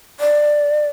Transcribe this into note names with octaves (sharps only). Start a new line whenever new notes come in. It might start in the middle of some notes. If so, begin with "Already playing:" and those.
D5